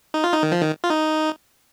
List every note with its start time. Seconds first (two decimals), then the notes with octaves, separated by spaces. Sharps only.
0.14 D#4
0.24 F4
0.32 D#4
0.43 D#3
0.52 F3
0.61 D#3
0.84 F4
0.90 D#4